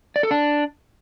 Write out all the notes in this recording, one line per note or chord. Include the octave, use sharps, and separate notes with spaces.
D5
A4
D4